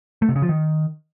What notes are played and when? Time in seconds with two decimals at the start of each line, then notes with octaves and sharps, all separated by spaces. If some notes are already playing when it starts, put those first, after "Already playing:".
0.22 A3
0.29 C3
0.35 C#3
0.42 F3
0.49 D#3